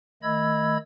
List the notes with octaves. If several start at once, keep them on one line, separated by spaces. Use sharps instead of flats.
D#3 A3 D#5 B5 E6 G#6